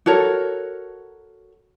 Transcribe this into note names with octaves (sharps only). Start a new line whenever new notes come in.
F#4 A4 A#4 C#5